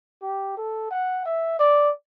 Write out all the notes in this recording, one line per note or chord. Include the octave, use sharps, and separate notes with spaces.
G4
A4
F#5
E5
D5